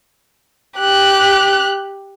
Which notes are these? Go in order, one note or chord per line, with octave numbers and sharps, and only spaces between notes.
G4 F#6